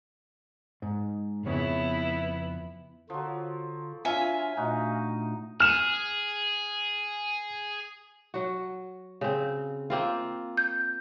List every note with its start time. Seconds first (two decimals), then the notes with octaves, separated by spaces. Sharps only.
0.82 G#2
1.46 F2 C#3 B3 E4 C#5
3.10 D3 F3 F#3 F4
4.05 D4 F4 C#5 E5 G#5
4.57 A#2 A3 D4 D#4 F#4
5.60 G#4 F6 E7
8.34 F#3 F#4
9.21 C#3 C4
9.90 A#3 C4 F4
10.57 G6